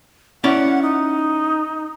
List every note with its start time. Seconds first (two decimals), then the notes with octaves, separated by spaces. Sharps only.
0.44 C#4 E4 D5 F#5
0.82 D#4